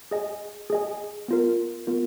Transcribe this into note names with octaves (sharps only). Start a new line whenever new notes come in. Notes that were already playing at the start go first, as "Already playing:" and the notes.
G#4 D#5 G#5
G#4 D#5 G#5
B3 F4 A#4
B3 F4 A#4